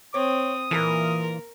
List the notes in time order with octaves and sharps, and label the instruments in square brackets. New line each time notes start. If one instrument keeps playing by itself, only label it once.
[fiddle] C4 [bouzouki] C#5 [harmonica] D#6
[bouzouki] A#2 A#3 F4 [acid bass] E3 [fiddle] A#4